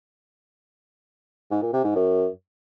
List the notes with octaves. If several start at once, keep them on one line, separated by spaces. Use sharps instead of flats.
G#2
A#2
C3
G#2
F#2